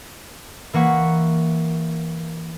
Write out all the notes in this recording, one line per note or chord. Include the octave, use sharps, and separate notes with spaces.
E3 A#3 F#5 C#6 B6